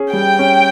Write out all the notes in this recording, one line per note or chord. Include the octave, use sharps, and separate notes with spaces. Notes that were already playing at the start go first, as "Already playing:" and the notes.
Already playing: C#4 G#4
G3 G5
C#4